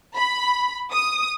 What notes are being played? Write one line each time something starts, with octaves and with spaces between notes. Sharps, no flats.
B5
D#6